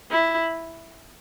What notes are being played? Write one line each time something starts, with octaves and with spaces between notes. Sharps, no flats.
E4